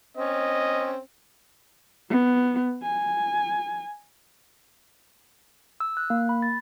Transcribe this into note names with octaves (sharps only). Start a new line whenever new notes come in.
C4 C#4 D#5
B3
G#5
E6
F#6
A#3
B5
A6